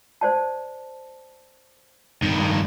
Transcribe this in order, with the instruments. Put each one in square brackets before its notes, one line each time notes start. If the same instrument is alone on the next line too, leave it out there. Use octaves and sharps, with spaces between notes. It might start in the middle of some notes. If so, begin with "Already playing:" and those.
[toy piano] C5 D5 A5
[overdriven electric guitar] G2 D#3